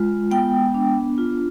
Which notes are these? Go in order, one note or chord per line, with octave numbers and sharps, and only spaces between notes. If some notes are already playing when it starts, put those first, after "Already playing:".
Already playing: G#3 F4
B3 G5
D4
F4